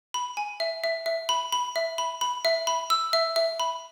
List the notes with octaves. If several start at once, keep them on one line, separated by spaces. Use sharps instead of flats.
B5
G#5
E5
E5
E5
B5
B5
E5
B5
B5
E5
B5
E6
E5
E5
B5